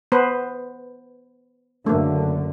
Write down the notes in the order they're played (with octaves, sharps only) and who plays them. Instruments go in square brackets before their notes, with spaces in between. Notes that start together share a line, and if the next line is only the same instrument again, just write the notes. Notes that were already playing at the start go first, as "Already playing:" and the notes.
[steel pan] B3 B4 C5
[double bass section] F#1 F#2 D3 [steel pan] A3 A#3